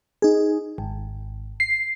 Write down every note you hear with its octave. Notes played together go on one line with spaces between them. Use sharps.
D#4 G#4
G#1
C7